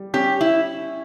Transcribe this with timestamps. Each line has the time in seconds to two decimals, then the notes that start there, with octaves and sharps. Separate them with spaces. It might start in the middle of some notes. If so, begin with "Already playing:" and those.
Already playing: G3
0.14 C#4 G4
0.41 E4